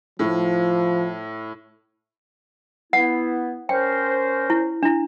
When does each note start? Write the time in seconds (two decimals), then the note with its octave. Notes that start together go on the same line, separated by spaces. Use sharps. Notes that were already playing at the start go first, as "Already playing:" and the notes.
0.19 A2 F3
2.93 B3 E4 F#5
3.69 C#4 A#4 C5 G5
4.50 E4
4.83 D4 E4